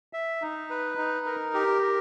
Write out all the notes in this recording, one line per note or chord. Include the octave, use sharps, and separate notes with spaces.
E5
D#4
B4
D#4
A#4
G4
A#4